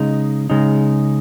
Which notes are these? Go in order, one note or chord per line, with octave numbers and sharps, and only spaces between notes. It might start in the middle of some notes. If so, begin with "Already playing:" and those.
Already playing: C#3 G#3 D#4
C#3 G#3 D#4